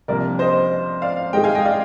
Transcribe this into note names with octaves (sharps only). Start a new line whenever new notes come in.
C2 C3 F3 A#3 D4 A#4 D5
C5 D#5
D5 F5
G#2 D#3 G#3 D#5 G5
F5 G#5
D#5 G5
D5 F5